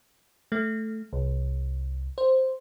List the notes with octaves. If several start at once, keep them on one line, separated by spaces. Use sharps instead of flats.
A3
C2
C5